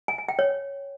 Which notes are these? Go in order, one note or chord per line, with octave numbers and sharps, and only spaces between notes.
G#5
G#5
G5
C#5